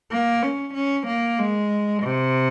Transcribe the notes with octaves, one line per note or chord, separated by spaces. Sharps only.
A#3
C#4
C#4
A#3
G#3
C3